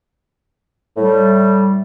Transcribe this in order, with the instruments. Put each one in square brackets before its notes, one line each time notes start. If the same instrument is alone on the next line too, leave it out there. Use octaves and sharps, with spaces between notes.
[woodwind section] A2 G3